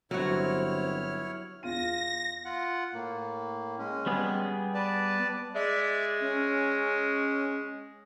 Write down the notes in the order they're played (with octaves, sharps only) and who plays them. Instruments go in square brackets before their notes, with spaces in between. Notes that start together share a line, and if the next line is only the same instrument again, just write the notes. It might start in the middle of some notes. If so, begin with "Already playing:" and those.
[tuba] G1 [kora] F#3 F#4 [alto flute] C4 [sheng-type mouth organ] E4 C#5 F6
[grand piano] E2 F4 D#7 [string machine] A#6
[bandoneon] F4 F#5
A2 A#3
G#3 C#4
[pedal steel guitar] G3 B3 G#4
[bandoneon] B4 D5 A5
[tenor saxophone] G#3 [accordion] D5 E5
[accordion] C#4